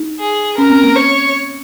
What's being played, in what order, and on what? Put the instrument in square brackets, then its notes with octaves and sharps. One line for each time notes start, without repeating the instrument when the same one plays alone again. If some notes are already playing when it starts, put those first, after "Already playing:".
Already playing: [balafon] D#4
[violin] G#4
[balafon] C#4 [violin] A#4
[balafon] C4
A#3
[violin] C#5